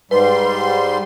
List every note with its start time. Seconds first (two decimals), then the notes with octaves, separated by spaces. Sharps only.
0.11 G#2 G3 B4 C6